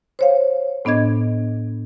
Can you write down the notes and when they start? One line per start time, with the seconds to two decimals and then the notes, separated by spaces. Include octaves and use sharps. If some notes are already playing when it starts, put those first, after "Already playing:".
0.19 C5 C#5 F5
0.85 A2 B3 D4 D#5 G#6